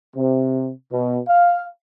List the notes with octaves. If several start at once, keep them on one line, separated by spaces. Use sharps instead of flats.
C3
B2
F5